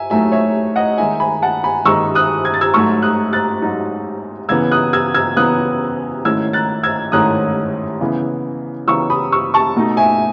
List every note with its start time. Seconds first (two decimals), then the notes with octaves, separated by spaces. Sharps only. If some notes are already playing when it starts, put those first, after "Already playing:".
Already playing: E5 G#5
0.10 A2 F#3 A3 D#4 E5 G#5
0.32 C#5 E5
0.76 D#5 F#5
0.98 D#3 G#3 D#4 E5 G#5
1.20 G#5 B5
1.42 F#5 A5
1.64 G#5 B5
1.85 D#3 G#3 D#4 C#6 E6
2.15 D#6 F#6
2.45 G#6
2.54 A6
2.61 E6 G#6
2.74 G#2 F#3 A3 D#4 C#6 E6
3.02 D#6 F#6
3.33 F#6 A6
3.62 G#2 F#3 A3 D#4
4.49 C#3 E3 B3 E6 G#6
4.71 D#6 F#6
4.93 E6 G#6
5.14 E6 G#6
5.36 C#3 E3 B3 D#6 F#6
6.25 G#2 D#3 A3 C#4 E4 E6 G#6
6.53 F#6 A6
6.83 E6 G#6
7.12 G#2 D#3 A3 C#4 E4 D#6 F#6
8.01 C#3 E3 B3 E4
8.87 C#3 E3 B3 E4 C#6 E6
9.10 B5 D#6
9.32 C#6 E6
9.54 A5 C#6
9.76 B2 A3 D#4
9.97 E5 G#5